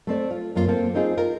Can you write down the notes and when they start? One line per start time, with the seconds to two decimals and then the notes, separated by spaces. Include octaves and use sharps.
0.07 A3 C4 D5
0.31 F4
0.55 F#2 A#3 F4
0.68 A#3 C4 A4
0.95 C4 D#4 F4 G#4
1.17 F4 A#4